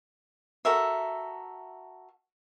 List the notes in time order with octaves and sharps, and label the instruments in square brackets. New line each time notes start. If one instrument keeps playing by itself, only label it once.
[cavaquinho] F#4 A4 A#4 E5